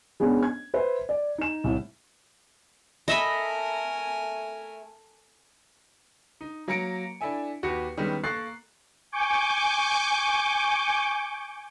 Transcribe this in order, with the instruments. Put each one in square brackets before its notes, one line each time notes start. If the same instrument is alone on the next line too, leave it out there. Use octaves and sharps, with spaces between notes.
[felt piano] G#3 B3 C#4 D4
G#6
B4 C5 E5
D5
D#4 E7
C2 A2
[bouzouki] A3 [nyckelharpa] A#4 G#5 [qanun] D#5 E5 B5
[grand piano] D#4
F#3 A#3 A#4 A#5 C#7 D7
D4 E4 A4 E5 G#5
D#2 F#4 G4 B4 C#7
D#3 G3 G#3 B3 C#4
A#3 A4 C#6 F#6 A6 C7
[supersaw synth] G#5 C#6 D6 G6